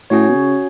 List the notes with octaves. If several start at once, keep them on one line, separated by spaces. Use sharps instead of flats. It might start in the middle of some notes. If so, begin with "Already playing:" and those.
A2 C#4 F#4 C#5
B2
C#3